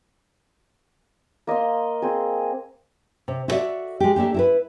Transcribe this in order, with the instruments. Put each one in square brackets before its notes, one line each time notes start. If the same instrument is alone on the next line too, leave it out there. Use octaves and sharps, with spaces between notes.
[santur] A#3 D#5 F5 C6
C4 G#4
[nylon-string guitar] C3
E4 F#4 A4 C5 D5 E5
G#3 G4
A3 A#3 D4 G4
E4 A#4 B4